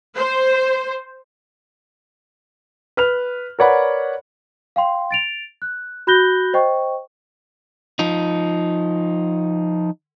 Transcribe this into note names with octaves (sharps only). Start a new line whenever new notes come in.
C5
B4 F6 F7
A#4 B4 C#5 D5 F#5 B5
F5 G5 C6
A6 D7 F7
F#6
F#4 B5 F#6 G6 A#6 G7
C5 D#5 G5 C#6
F3 D#4